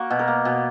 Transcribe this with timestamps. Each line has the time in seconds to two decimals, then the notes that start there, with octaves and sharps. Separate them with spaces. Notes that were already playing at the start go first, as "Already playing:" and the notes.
Already playing: A#3 F#4
0.10 B2
0.19 A#4
0.28 A#3
0.45 B2